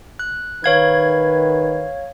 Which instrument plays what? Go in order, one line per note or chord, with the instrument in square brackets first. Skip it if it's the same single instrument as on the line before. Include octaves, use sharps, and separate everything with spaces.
[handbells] F#6
[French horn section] D#3 B4 [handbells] C#5 F5 G#6